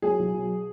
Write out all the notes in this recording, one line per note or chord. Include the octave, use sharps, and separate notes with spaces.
F#3 G#4
B1
B2